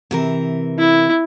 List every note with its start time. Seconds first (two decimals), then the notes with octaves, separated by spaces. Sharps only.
0.11 C3 E3 A#4
0.79 E4